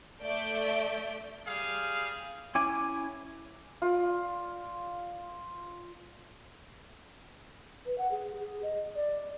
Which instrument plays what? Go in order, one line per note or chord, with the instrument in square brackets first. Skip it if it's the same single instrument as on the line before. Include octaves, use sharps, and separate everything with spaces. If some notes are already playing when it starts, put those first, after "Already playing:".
[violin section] A3 D5 E5 G6 D7
[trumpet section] G3 G#4 F5
[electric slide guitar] C#4 E4 G#5 [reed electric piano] D6
[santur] F4 D5
[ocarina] B4
F#5
G#4
G#4
D#5
D5